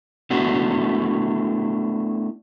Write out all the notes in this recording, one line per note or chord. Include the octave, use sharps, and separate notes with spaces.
A3 B3 D4 E4 F#4